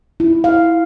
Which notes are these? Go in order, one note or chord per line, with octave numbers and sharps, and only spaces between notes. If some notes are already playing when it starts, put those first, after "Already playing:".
E4
F5